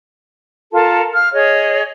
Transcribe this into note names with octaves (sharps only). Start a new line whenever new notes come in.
F4 A4 A#4 A5
F5 F6
G#4 C#5 D#5